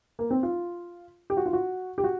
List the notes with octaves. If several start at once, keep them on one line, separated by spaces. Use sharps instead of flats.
A#3
C4
F4
G4
F#4
F4
F#4
G4
F#4